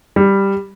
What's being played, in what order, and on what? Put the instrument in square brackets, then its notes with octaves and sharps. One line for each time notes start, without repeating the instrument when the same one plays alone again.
[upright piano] G3